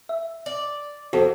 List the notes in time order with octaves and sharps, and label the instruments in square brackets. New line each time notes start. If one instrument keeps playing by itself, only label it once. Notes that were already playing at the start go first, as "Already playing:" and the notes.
[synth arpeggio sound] E5
[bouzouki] D5
[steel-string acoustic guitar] F2 [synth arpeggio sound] F#4 A4